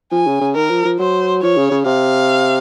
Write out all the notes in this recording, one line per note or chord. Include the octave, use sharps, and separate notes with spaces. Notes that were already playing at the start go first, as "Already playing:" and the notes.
F3 G#5
C#3
C#3
D#3 A#4
F3
F3
F#3 C5
F3 C#5
C#3
C#3
C3 F5